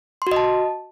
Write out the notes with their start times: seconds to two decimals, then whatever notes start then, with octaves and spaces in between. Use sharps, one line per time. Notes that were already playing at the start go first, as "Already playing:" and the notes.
0.22 C6
0.27 F#4
0.32 D#5
0.36 A5